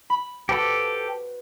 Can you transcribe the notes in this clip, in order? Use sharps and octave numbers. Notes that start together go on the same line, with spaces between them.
B5
F#4 G4 A4 B4 C5